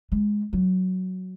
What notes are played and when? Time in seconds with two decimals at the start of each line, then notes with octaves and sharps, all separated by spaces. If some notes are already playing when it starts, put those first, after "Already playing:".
0.12 G#3
0.53 F#3